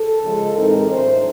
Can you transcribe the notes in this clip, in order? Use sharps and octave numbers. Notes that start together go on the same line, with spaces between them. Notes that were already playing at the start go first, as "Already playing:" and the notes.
Already playing: A4
C#3 F3 G#3
A2 E3 G#3 C4 D#4 A#4
A2 F#3 A3 D4 C5